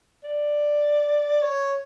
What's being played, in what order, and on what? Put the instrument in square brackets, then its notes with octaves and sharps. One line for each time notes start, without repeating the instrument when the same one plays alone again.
[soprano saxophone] D5
C#5